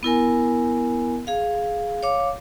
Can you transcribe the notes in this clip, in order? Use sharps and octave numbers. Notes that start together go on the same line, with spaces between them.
B3 E4 A#4 G#5
G#4 F5
C#5 F5 D6